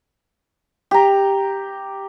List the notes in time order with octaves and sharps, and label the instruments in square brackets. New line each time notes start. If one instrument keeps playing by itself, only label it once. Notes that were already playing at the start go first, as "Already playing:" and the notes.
[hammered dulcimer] G4 A#5